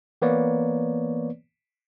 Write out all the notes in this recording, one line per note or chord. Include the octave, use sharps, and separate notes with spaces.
E3 A#3 B3 B4 C#5 D5